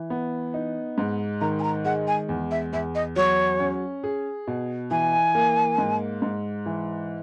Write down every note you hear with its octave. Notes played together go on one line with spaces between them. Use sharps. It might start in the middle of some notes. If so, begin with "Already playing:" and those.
Already playing: E3
B3
D#4
G#2
D#3 A#5
G#5
A#5
G#3 F#5
G#5
E2
E5
E2 E5
D#5
F#3 C#5
C#4
G#4
B2
E3 G#5
A#3
G#2
G#2
E3